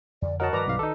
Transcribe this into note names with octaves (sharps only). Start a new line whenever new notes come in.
F2 D3 D5
F#4 A#4 C#5 D#5 F#5 A5
G2 D#3 F3 B4 D5 A#5 D6
B1 F5
D#3 D#4 A4